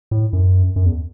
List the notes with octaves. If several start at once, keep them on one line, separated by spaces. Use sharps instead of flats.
A2
F#2
F#2
E2